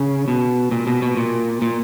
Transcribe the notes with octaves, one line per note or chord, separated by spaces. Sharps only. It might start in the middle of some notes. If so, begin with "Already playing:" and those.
Already playing: C#3
B2
A#2
B2
B2
A#2
A#2